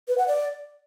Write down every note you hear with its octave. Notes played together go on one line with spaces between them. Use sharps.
B4
F#5
D5